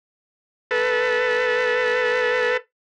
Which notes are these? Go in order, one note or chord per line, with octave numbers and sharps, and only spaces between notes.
A4 B4